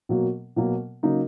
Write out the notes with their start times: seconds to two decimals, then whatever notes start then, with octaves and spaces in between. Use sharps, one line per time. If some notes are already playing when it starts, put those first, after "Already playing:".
0.09 B2 F#3 A#3
0.56 B2 F#3 A#3
1.03 C#3 F#3 A#3 D#4